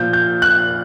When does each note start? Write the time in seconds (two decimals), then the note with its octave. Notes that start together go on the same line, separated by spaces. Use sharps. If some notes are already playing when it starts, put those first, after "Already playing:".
Already playing: A#2 F3 G6
0.13 G6
0.42 F#6